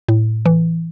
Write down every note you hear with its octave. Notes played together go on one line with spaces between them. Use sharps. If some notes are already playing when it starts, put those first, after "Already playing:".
A2
E3